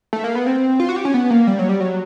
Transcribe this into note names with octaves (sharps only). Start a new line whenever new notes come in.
A3
A#3
B3
C4
F4
F#4
G4
C#4
B3
A#3
G3
F#3
G3
F#3